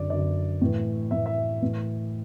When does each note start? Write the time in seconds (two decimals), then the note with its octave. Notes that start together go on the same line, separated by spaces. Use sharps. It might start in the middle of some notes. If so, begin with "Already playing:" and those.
Already playing: F#2 D3 D5
0.10 F#2 D3 D5
0.61 A2 E3
1.11 A2 E3 E5
1.26 E5
1.62 A2 E3